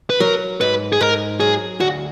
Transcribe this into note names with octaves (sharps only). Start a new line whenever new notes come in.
B4
F#3 A#4
G#2 B4
G#4
G#2 A#4
F#3 G#4
D2 F#4